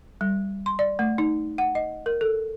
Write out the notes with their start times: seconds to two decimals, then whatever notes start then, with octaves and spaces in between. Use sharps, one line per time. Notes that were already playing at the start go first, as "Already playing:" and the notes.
0.21 G3
0.66 C6
0.79 D5
0.99 A3
1.18 D#4
1.58 F#5
1.75 D#5
2.06 A#4
2.21 A4